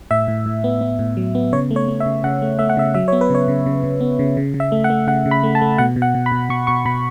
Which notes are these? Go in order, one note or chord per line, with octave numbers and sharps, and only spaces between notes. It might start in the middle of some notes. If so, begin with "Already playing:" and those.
A2 E5
A2
A2
B3
B3
A2
F#3
B3
C#3 C#5
A3
C#5
A3
E5
C#3
C#3 F#5
A3
A3 E5
F#5
C#3 E5
F#3 E5
B3 C#5
B4
C#3 C#5
C#3
C#3
C#3
B3
C#3
C#3
C#3
E5
A3
F#5
A3
C#3 F#5
C#3
B5
A3
A5
A3
B2 F#5
B2
F#5
B2
B5
B2
B2 C#6
B2 C#6
B2 B5